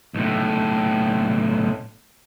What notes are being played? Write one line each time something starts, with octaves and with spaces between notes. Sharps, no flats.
B1 A2